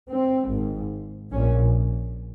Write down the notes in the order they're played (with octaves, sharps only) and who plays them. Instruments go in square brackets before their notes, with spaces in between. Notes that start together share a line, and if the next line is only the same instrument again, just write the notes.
[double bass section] C4
G#1 G#2
A#1 A#2 C#4